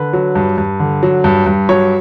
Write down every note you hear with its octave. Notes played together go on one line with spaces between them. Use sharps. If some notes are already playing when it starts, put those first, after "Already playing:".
Already playing: D3 B4
F#3
G2
G2
D3
F#3
G2
G2
F#3 C#5